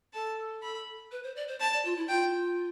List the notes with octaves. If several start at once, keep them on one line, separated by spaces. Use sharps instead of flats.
A4 A5
B5
B4
C5
D5
C5
C5 A5
D5
F4
E4
F4 G5